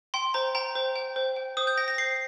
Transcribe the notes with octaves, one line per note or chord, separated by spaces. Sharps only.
G5 C6
C5 A#5
G5 A#5
C5
G5
C5
G5
C5 D#6
G6
G5 A#6
A#6
C5 C7